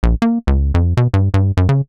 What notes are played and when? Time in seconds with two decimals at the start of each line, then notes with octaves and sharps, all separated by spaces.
0.03 A#1
0.22 A#3
0.47 C#2
0.74 F2
0.97 B2
1.14 G2
1.34 G2
1.57 F#2
1.69 C#3